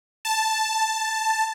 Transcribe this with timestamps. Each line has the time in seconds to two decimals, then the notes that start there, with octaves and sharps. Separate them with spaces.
0.25 A5